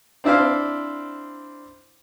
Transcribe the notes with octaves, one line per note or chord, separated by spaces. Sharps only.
C4 D4 E4 C5 F5